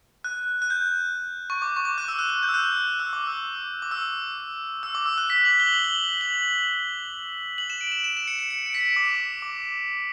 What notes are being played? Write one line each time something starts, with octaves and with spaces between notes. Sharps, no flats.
F#6
F#6
G6
C#6
D6
C#6
D6
F#6
E6
F#6
F#6
G6
E6
F#6
E6
D6
E6
D6
E6
E6
D6
E6
F#6
B6
F#7
G7
F#7
G7
F#7
F#7
E7
D7
E7
E7
E7
C#7
C#7
C#7
D7
B6
C#7
D6
D6